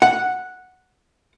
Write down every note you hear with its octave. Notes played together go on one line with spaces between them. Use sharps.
F#5